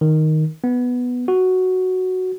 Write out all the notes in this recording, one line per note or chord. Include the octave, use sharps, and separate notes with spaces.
D#3
B3
F#4